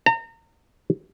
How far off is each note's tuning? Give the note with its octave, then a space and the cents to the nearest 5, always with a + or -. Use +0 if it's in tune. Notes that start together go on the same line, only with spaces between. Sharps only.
A#5 -35